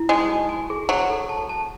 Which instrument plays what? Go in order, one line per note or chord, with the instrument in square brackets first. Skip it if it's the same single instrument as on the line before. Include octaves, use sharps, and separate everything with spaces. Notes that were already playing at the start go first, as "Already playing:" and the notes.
Already playing: [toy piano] E4
[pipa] G#3 [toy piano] D#4
[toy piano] F#4
G#5
G#4
[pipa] F#3 [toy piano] F#5
[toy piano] A4
A5
A5